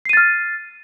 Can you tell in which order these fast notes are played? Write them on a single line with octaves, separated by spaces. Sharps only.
C7 D#7 A6 F6